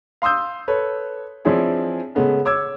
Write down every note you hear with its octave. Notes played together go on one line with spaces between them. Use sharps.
F5 C6 D#6 E6 G6
A4 B4 C#5
F3 C4 D4 E4 G#4 C#5
C#3 G#3 A3 B3 C#4
C#5 D6 E6 G#6